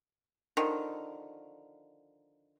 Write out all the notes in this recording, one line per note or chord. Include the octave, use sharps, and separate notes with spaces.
D3 D#3 F3